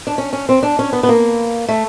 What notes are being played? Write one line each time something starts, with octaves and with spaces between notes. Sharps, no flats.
D4
C#4
C#4
C4
D4
C#4
B3
B3
A#3
A3